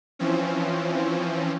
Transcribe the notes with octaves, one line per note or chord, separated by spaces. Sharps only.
E3 F3 C4 C#4